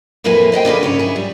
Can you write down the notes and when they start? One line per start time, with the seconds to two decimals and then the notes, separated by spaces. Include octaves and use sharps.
0.24 F2 A2 A#3 E4 B4 G#5
0.52 C5 D#5 F#5 G5
0.65 D3 A#3 G#4 B4
0.83 G#2 C#3 C#5
0.99 E4 G#4
1.16 G3